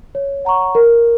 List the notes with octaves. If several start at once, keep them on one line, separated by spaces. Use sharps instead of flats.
C#5
F#5 A#5 C#6
A#4